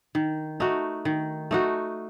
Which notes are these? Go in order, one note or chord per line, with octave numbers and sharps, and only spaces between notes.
D#3
A3 D#4 F#4
D#3
A3 D#4 F#4